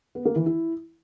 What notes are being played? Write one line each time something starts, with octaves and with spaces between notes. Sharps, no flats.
B3
A#3
E3
E4